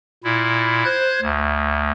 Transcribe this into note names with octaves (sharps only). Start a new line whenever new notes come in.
A#2 E4
C5 F#6 G#6
D2